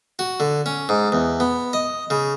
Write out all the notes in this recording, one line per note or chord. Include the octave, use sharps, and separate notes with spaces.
F#4
D3
C#4
G#2
E2
B3
D#5
C#3